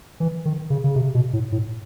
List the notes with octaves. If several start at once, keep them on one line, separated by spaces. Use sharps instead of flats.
E3
D#3
C#3
C#3
C3
B2
A2
A2